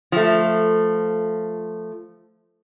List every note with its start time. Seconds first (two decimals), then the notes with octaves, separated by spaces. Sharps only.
0.12 F3 A3